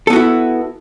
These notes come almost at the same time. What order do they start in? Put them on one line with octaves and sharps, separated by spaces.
A4 B3 F#4 E4